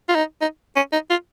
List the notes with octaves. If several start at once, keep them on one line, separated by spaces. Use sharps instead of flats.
F4
D#4
D#4
C#4
D#4
F4